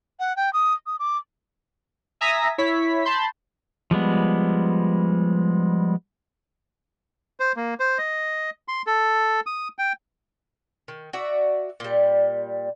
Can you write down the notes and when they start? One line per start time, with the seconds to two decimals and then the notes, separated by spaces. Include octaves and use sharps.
0.20 F#5
0.37 G5
0.53 D#6
0.86 D#6
0.99 D6
2.21 E5 G#5 A#5 D#6 A#6 B6
2.58 E4 C#5 B6
3.05 A5 B5 C6 G6
3.91 F3 G3 G#3 B3
7.40 C5
7.56 A#3
7.80 C5
7.98 D#5
8.68 C6
8.87 A4
9.46 D#6
9.79 G5
10.88 D#3
11.13 F#4 D5 E5
11.80 A#2 G3